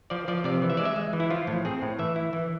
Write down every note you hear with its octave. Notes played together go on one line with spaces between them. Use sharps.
F3 D5
F3 D5
C3 D5
E3
E5
G#3 D5
E5
G#3
E3
E4
F3 F4
A2
C4 G#4
A2
E3 E5
E4
E3